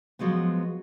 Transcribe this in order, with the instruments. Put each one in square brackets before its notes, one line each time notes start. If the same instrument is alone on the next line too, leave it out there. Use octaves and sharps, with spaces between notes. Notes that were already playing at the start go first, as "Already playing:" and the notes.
[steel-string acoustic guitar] F3 F#3 G#3 B3